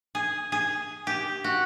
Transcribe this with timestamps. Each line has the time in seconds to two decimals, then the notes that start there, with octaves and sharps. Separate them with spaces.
0.15 G#4
0.52 G#4
1.07 G4
1.44 F#4